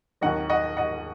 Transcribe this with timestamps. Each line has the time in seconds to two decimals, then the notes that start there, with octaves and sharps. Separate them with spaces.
0.21 D#2 D#3 F#3 D#5 F#5
0.50 D#5 F#5
0.77 D#5 F#5